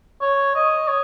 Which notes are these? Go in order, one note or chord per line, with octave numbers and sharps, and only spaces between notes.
C#5
D#5
C#5